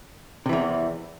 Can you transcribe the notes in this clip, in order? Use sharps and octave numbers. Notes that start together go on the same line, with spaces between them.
E2 C3 E3